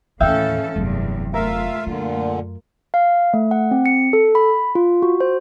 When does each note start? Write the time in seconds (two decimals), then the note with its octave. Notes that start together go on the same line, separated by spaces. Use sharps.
0.20 D#2 A2 E3 C#4 A4 E5 F5 G5
0.76 F1 E2 G2 F#3
1.34 A3 F4 A#4 E5 F5
1.87 F#2 A#2 D3
2.94 F5
3.34 A3
3.51 F#5
3.71 C4
3.86 C#7
4.13 A4
4.35 B5
4.75 F4
5.02 F#4
5.20 C5